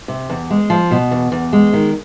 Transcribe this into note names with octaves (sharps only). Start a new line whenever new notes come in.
C3
E2
G#3
F3
B2
E2
E2
G#3
D#3